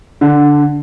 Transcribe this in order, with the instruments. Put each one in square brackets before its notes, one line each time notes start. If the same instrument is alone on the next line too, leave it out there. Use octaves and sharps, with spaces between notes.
[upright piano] D3